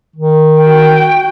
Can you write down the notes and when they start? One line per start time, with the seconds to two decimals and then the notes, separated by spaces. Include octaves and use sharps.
0.16 D#3
0.62 F#4 G5